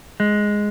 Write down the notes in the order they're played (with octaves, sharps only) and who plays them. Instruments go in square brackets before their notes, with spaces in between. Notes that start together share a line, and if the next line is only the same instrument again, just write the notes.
[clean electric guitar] G#3